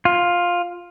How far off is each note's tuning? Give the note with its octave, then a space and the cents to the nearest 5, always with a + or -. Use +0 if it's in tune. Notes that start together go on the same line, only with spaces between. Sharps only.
F4 +10